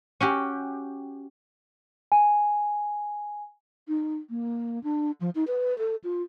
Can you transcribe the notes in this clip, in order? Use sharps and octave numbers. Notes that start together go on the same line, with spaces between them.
C#4 F#4 G4
G#5
D#4
A#3
D4
F3
D#4
B4
A4
F4